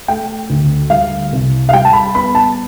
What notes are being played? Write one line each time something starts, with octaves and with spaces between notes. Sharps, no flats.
A3 G5
D2
G3 F5
C2
F5
G3 G5
A5
B5
B3 B5
A5